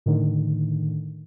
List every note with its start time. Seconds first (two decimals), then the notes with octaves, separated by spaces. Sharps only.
0.06 A2 D3 D#3